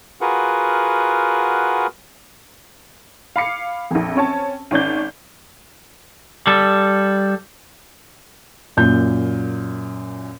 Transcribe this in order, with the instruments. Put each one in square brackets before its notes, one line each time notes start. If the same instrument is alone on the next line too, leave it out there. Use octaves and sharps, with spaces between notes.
[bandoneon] F4 F#4 G#4 A#4 B4 F#5
[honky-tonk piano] F5 B5 D6 C7 C#7
A#1 F2
C4 C#4 C#5 A5
G#1 C#4 D5 G6
[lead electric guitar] G3 A4
[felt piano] F#2 A#2 G6